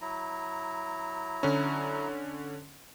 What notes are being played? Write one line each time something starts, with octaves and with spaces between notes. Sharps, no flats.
F#3 E4 A#5
D3 C#4